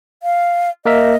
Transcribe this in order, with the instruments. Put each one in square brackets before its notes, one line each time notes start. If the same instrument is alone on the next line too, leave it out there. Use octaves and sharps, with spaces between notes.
[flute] F5
[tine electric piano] A#3 A#4 E5 [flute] D#5